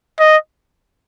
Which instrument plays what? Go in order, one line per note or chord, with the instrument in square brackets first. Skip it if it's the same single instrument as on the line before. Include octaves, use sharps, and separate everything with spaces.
[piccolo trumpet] D#5